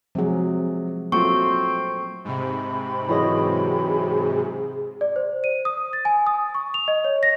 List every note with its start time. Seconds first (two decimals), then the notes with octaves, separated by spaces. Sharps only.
0.15 C3 F3 F#3 G#3 G#4
1.12 F#3 A3 A#3 C4 F4 C#6
2.25 G#2 C3 G5 B5 C#6
3.09 E3 F#3 G#4 D#5
5.01 D5
5.16 C5
5.44 D#7
5.65 D#6
5.93 A6
6.05 G#5
6.27 D#6
6.54 C#6
6.74 F7
6.88 D#5
7.04 C#5
7.23 A#6